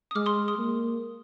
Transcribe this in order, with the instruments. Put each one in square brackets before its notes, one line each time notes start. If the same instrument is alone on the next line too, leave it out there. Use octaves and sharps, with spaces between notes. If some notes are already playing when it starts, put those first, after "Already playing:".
[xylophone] D#6
[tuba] G#3 [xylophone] D6 F6
[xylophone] C6 D#6
C6 D#6
[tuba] A#3